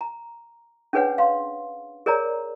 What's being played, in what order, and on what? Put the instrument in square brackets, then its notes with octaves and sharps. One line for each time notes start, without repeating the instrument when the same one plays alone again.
[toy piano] A#5
C#4 D4 G#4 B4 C#5 F#5
F5 C6
G#4 A#4 C#5 D5 A#5